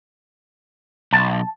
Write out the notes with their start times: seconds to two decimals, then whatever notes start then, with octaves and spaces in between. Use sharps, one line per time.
1.13 B1 A5